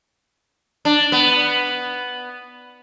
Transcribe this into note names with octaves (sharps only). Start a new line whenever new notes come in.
D4
B3